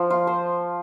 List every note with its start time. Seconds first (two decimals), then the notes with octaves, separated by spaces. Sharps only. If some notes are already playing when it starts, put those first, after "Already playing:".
Already playing: F3
0.10 F4
0.27 C5